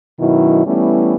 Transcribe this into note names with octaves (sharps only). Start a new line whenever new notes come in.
F#2 B2 D#3 F#3 E4
E3 G3 A3 B3 C#4 E4